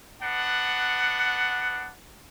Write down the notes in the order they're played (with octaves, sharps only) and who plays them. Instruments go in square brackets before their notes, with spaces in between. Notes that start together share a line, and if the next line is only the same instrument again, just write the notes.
[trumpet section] B3 D4 F#5